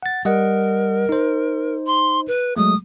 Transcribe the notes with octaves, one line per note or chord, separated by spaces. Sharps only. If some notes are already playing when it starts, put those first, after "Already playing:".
F#5 A6
G3 A#4 D#5 F#5
D#4 C5
C6
B4
F#3 G#3 A3 D#6